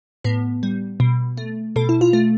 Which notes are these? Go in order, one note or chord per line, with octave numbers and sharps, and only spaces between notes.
A2 B3
G3
B2
A3
B2 A4
E4
F4
A3